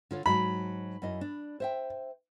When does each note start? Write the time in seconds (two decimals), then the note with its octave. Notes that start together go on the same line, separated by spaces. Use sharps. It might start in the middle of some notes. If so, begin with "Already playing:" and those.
0.11 D3 F4 C#5
0.26 G#2 F#3 A5 B5
1.02 F#2 E4 D#5
1.21 D4
1.60 C5 E5 G5